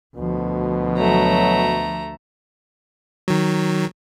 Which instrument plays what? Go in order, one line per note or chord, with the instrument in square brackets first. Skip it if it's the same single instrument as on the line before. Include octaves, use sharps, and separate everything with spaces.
[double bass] D2 F3 [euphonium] B2
[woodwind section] F#3 [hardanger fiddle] A3 A#5
[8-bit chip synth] D#3 F#3